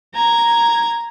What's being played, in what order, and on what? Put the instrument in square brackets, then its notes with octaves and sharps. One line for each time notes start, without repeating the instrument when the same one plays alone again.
[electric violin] A#5 G#6